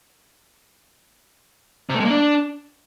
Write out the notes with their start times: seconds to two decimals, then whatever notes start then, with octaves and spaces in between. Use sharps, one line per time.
1.90 C3
1.95 A3
2.00 G#3
2.05 A#3
2.10 D4